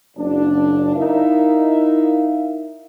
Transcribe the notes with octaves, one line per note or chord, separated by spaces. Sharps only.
F#1 D4
D#4 E4 A#4 E5 F5